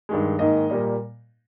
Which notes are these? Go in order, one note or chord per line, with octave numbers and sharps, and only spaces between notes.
G2 D#3 G#3
G#2 D#3 A#3 D#5
A#2 G3 A#3